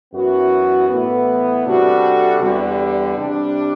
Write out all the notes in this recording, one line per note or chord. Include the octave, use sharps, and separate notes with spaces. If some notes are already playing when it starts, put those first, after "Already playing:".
F#2 E3 B3 F#4
A2 E3 B3
C3 G3 D4 F#4 A4
E2 D3 G3
C3 G3 D4